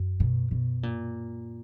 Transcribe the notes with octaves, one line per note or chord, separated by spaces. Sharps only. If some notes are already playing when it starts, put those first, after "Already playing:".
Already playing: F#2
B2
B2
A#2